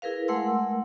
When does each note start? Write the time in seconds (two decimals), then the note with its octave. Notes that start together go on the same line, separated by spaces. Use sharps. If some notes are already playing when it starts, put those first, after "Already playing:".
0.02 E4 G#4 A#4 B4 F5
0.28 G#3 A3 A#4 F#5 C6 E6